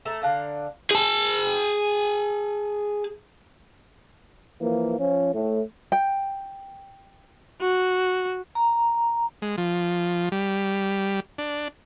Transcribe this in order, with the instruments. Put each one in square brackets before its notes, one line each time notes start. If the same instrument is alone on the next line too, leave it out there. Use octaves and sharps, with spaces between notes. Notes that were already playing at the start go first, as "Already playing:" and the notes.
[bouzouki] A3 A4 A5 A#5
D3 D4 F5 A#5
[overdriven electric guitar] G#4 A5
[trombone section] E3 F3 A#3
F3 C#4
A2
[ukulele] G5
[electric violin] F#4
[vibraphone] A#5
[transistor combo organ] G#3
F3
G3
D4